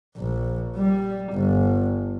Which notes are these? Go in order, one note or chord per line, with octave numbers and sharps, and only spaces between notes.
A#1
G3
G1